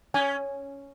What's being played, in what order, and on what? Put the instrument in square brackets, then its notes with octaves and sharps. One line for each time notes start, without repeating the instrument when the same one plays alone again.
[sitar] C#4 [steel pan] G#5